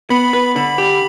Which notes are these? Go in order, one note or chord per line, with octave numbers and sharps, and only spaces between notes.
B3 B5
B4
D3 B5
G4